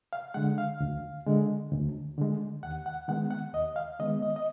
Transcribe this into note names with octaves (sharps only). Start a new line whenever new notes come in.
F5
D3 G#3 F#5
F5
D2
D3 G#3
D2
D3 G#3
D#2 F#5
F#5
D#3 G#3 B3 F#5
F#5
D#2 D#5
F5
D#3 G#3 B3 D#5
D#5
D#5